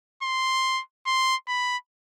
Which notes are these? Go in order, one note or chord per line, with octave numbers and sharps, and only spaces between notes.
C6
C6
B5